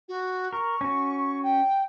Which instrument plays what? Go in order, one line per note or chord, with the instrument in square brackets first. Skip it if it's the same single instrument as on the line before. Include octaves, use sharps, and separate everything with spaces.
[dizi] F#4
[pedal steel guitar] A#4 [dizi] C#6
[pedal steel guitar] C#4 F#4
[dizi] G5